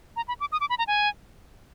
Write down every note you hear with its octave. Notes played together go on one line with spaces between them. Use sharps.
A#5
B5
D6
D#6
D6
B5
A#5
G#5